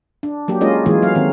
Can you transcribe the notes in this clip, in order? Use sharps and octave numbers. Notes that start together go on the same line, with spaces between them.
D4
F#3 A#3 G4
G#3 A#3 C#4 F4 D#5
E3 F#3 G#3 A#3 F4 G#4
F#3 A3 F5
D#3 C4